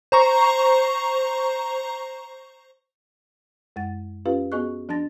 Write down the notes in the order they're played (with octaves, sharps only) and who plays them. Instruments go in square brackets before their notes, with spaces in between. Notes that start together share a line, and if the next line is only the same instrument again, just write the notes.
[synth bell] C5 A#5 C#6
[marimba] F#2 G#3 F#5 A6
C#4 F4 G4 B4 F5
B3 F#4 G#4 D#5 C#6 F#6
F3 D4 A5 A6 A#6